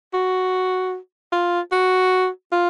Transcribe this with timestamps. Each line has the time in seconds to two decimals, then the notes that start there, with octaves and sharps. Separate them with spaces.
0.14 F#4
1.32 F4
1.72 F#4
2.52 F4